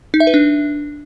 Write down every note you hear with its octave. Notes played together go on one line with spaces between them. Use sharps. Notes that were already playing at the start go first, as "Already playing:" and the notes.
D#4
E5
B4
D4